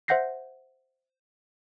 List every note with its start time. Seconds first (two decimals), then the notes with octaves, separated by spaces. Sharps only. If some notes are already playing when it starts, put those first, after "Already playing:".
0.08 C5 E5 F#5 G6 A#6 C7